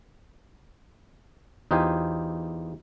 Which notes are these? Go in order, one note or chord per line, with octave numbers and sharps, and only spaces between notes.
E2 D#4 F4 G4 C5 G#5